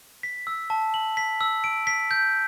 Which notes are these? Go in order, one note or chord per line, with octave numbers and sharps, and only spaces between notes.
B6
E6
A5
F#7
B6
E6
D7
B6
G6